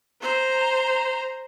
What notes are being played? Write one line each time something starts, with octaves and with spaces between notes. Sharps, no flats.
C5 A#5